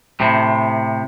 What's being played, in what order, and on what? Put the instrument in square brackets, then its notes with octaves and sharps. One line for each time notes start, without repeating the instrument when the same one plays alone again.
[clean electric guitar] A2 C3